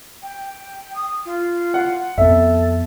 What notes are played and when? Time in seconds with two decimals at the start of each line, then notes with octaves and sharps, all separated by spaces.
0.23 G5
0.95 D#6
1.26 F4
1.74 F#5
2.18 F2 B3 A4 E5